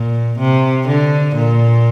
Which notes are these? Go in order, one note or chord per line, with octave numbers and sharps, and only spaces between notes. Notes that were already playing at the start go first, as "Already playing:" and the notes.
Already playing: A#2
C3
D3
A#2